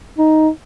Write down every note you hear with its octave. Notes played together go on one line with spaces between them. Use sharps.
D#4